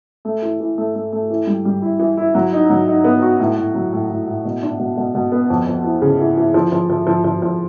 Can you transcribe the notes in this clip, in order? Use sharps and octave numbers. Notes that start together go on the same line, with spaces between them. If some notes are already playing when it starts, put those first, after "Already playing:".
A3
E3
E3
A3
A3
A3
E3
G3
G3
E4
E3
E4
F#3
D#4
F#3
D#4
B3
F#4
A2
A2
F#3
A2
A2
A2
B2
D4
B2
B2
B2
B3
F2
F2
E3
C#3
E3
E3
F3
F3
F3
F3
F3
F3